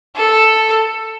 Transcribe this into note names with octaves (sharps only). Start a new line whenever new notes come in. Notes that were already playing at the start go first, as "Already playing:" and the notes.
A4